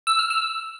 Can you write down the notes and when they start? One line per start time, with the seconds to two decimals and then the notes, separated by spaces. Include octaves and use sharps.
0.07 E6
0.19 F6
0.30 E6